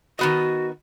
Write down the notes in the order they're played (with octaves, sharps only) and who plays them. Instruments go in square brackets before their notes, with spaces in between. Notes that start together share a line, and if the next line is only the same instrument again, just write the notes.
[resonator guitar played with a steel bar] D#3 B3 D#5 [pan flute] F#4